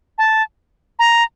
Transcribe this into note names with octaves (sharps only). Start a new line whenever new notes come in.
A5
A#5